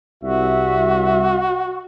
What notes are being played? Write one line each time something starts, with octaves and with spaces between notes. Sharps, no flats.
C2 F#4 E5